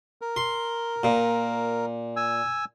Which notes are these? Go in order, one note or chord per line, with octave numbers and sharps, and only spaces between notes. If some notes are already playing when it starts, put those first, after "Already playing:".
A#4
C6
A#2
G#5 E6